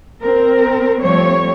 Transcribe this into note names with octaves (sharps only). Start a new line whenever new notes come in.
C4 A#4
F3 G3 A3 C4 C#5